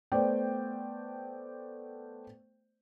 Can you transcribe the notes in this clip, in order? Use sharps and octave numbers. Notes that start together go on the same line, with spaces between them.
A3 B3 C5 D5 G5